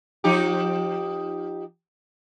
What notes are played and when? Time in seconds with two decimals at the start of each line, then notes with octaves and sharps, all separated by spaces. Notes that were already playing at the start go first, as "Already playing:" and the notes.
0.24 F3 D#4 G4